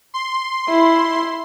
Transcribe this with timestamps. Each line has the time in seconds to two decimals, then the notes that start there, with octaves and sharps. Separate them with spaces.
0.14 C6
0.69 E4